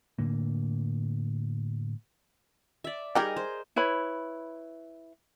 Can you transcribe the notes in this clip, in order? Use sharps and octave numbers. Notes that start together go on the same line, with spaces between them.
A2 D3 A#3
D5 E5
G3 D#4 G4 G#4 A#4 D#5
C5
E4 B4 C#5 B5